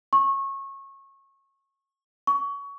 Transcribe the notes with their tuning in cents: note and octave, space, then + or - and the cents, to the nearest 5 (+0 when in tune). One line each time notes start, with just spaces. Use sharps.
C#6 -25
C#6 +25